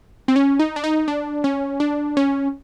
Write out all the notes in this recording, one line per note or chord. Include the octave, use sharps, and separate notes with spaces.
C4
C#4
D#4
D4
D#4
D4
C#4
D4
C#4